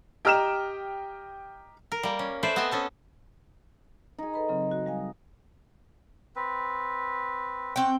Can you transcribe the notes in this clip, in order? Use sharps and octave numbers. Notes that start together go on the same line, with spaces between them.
G4 D#5 G5 A#5 F6 E7
A#4
G3 A#3
C#4
A3 B4 C5 D5 E5
B3 C4 D#5 G#5 A5
C#4 A4 A5
D#4 G#4
A4 B4 B5
C#3 F#3 C4
F#4
G3 F5 G#5
C4 B4
C4 F#5 G5 C#6